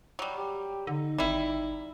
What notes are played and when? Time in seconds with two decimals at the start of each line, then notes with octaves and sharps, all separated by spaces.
0.19 F#3 G3
0.36 G4
0.87 D3 D#4
1.18 G#1 G3 E4